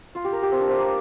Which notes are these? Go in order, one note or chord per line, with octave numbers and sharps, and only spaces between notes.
F4
G4
A#4
G4
C4
D4
C4
A#3